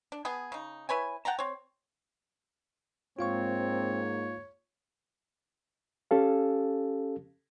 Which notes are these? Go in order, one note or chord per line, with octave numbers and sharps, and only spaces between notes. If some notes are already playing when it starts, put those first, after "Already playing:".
D4
B3 G#4
C#3 D#4
E4 B4 C#5 G#5
F#5 G5 A5 A#5
C4 C#5
G#2 A#3 C4 F4 C#5 F5 C#6
C#4 G4 A4 F5